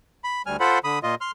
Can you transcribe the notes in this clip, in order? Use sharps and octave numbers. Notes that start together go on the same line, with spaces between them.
B5
D2 G3 G#5 F6
F4 A4 C5 F#5 B5
D3 B5 D#6
A#2 F4 D#5
C6 F6